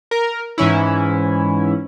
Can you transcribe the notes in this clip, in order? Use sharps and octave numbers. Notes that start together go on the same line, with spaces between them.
A#4
G#2 E3 C#4 E4